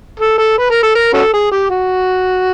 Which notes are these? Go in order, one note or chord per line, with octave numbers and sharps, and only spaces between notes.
A4
A4
B4
A#4
A4
A#4
C#4 F#4 A4
G#4
G4
F#4